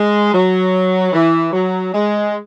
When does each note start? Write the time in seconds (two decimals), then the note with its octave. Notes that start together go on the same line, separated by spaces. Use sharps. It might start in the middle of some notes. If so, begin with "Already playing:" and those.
Already playing: G#3
0.33 F#3
1.13 E3
1.52 F#3
1.93 G#3